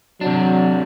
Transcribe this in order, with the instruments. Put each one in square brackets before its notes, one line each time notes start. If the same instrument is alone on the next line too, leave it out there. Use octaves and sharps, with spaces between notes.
[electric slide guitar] C3 D4 [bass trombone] F#3